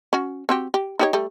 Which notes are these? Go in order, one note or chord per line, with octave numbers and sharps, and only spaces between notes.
C#4 F#4
C4 F#4 G4
G4
D#4 G4 C#5
G3 A3